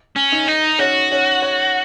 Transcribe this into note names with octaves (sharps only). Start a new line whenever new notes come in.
C#4
D#4
D#4
C#4 F#4
C#4
C#5